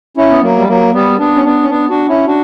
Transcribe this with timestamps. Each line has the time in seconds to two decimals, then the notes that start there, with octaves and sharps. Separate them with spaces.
0.17 C#4 E4
0.30 B3
0.42 F#3 A#3
0.57 G3
0.68 F#3 A#3
0.93 G3 B3
1.19 B3 D4
1.36 C#4
1.44 B3 D4
1.62 C#4
1.70 B3 D4
1.90 D4 F#4
2.08 C#4 E4
2.27 D4 F#4